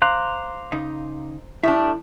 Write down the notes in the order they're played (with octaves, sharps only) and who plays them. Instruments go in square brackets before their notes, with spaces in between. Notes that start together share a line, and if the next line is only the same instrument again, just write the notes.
[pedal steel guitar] C5 A#5 F#6 [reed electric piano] F5 C6 D6
[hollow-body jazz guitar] C#3 D#4
[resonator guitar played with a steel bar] A2 G3 D4 [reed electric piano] E4 [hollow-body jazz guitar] E5